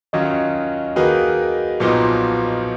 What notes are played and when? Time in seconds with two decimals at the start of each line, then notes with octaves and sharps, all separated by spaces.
0.13 D#3 F#3 C#4 F4 D#5
0.96 D#3 A#3 D#4 F#4 G#4 B4
1.80 B1 A#2 F3 B3 D#4